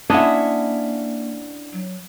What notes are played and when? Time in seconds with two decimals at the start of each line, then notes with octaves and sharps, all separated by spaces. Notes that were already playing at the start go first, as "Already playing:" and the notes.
0.10 A#3 C#4 D4 E4 D#5 E5 F#5
1.73 F#3